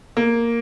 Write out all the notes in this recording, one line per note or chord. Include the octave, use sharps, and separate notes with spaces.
A#3